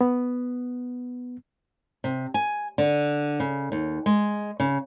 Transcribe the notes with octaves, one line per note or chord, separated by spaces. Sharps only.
B3
C3
G#5
D3
C#3
D#2
G#3
C#3